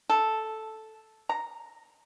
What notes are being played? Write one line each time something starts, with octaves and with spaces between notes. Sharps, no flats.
A4
A#5